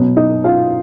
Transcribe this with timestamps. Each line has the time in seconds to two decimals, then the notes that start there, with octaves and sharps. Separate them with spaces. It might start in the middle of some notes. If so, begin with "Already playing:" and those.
Already playing: B2 F#3 B3
0.16 D#4 D#5
0.44 F4 F5